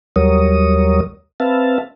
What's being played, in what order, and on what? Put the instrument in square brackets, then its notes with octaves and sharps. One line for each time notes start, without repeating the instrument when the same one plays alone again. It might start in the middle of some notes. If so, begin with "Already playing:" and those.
[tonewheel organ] D#2 F#3 G3 A#4 C#5 D#6
C4 B4 E5 F5 A5